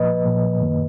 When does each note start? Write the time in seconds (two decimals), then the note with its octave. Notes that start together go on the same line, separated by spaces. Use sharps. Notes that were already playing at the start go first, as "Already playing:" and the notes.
Already playing: A#2 F3 A#3 B4 D#5
0.25 A#2 F3 A#3
0.60 F#2 D#3 A#3